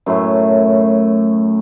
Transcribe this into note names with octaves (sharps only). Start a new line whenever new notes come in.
F#2 A2 A3